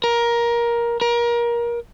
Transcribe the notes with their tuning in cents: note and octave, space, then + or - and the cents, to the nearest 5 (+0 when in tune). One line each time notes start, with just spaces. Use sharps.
A#4 +15
A#4 +25